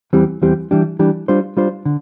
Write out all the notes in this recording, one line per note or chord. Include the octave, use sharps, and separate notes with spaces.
E2 E3 G3 C4 G4
E2 E3 G3 C4 G4
E3 G3 D4 G4
E3 G3 D4 G4
G3 D4 F4 C5
G3 D4 F4 C5
D3